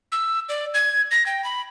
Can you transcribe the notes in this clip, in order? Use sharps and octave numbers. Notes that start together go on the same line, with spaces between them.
E6
D5
G#6
A#6
G5
B5